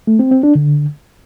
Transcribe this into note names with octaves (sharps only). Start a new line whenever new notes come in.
A3
C4
C4
D4
D3